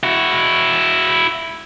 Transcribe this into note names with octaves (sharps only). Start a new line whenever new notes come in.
E4 F#4